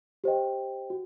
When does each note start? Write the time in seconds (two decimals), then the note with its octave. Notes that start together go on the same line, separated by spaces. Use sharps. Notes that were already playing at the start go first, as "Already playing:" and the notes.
0.24 G4 C5 D#5 G5
0.90 F#4